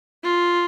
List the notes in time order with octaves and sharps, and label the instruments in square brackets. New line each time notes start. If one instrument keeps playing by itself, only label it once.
[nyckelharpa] F4